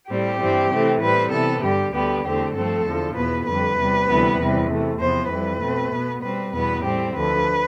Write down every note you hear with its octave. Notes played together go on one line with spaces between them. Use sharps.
A2 G3 C4 G4
G2 E3 G3 C4
C3 E3 A3 C4
A2 G3 C4 B4
C3 E3 B3 A4
G2 D3 G3 G4
D2 D3 G3 B3 G4
E2 D3 A3 C4 G4
G2 F3 A3 C4 A4
E2 D3 F3
E2 B2 B3 B4
F2 D3 G3 B4
E2 C3 G3
D2 C3 E3 G3 B3
E2 C3 E3 G3
C3 E3 A3
E2 C3 F3 B3 C5
F2 E3 G3 C4 B4
B2 A3 C4
B2 B3
B2 G3 C4 B4
E2 B2 G3 B3 B4
A2 G3 C4 G4
D2 D3 F3 B4